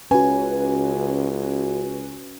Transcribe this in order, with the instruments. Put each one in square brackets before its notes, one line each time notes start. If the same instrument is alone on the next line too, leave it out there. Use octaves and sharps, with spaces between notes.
[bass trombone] C#2 [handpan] C#4 [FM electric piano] F#4 B4 [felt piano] G#5